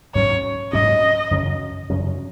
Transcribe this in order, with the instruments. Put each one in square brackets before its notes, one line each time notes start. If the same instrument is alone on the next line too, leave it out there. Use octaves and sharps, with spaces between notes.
[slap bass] G#2 F#3 C#4 [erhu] C#5
[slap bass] G#2 F#3 C#4 [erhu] D#5
[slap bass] F#2 C#3 F#3 C#4
F#2 C#3 F#3 C#4